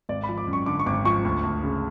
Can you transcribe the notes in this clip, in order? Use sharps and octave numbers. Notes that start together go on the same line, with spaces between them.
G#1 D5
B5
F3
D6
F#2
C#6
D3 D6
C#6
G#1 D6
F3 C#6
D2
D2
C#3